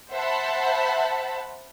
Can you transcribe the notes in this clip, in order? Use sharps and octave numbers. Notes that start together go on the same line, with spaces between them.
C5 E5 F#5 A5 B5